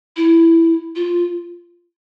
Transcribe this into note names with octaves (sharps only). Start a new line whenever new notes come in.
E4
F4